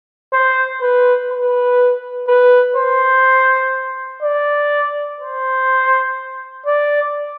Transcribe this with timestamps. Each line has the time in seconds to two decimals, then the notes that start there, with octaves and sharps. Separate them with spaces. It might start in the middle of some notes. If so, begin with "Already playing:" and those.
0.33 C5
0.82 B4
1.31 B4
2.28 B4
2.76 C5
4.23 D5
5.21 C5
6.66 D5